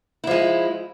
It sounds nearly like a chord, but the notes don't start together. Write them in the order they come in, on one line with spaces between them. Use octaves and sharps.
E4 F3 G#3